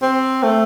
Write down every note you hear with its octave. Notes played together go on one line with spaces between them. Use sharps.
C4
A3